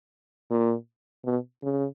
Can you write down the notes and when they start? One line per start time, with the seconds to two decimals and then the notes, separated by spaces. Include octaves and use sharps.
0.51 A#2
1.25 B2
1.63 C#3